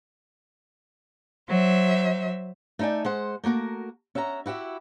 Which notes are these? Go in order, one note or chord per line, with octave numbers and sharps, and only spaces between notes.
F#3 C5 E5
A3 D#4 A4 D5 G#5
G#3 C5 F#5
A3 A#3 F#4 A#4
C#4 E5 F#5 A5 A#5
E4 F#4 G4 E5